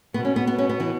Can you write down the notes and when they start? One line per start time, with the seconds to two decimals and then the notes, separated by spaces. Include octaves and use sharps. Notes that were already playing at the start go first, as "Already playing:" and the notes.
0.14 B2 B3
0.25 C#4
0.36 B3
0.47 B3
0.59 C#4
0.69 B3
0.80 E3